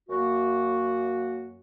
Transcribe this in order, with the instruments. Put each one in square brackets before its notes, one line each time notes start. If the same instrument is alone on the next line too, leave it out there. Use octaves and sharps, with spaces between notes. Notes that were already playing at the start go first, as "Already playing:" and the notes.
[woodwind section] F#2 A#3 F#4